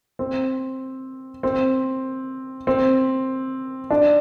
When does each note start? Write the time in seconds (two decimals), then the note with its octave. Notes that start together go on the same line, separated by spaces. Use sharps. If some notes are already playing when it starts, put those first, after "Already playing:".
0.19 C4
1.43 C4
2.67 C4
3.91 D4